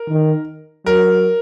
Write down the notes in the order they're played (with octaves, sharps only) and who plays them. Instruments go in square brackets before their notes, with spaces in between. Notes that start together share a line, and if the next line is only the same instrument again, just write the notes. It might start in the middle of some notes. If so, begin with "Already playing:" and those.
Already playing: [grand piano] A#4
[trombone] D#3
[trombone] F#3 [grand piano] A#4